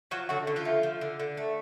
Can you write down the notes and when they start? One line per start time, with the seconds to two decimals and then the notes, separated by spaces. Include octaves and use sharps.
0.11 F3 F#3 F#4
0.29 D3 F#3 F#4
0.47 D3
0.56 F3 F4
0.65 A3
0.83 F3
1.01 D3
1.19 D3
1.37 A3